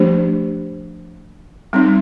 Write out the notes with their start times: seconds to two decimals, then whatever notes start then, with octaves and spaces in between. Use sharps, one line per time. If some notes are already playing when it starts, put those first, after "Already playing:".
Already playing: F3 A3 D4 G4 C5
1.73 G3 C4 D#4